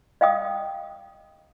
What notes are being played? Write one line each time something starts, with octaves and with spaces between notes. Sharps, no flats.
D#5 F5 G5 D#6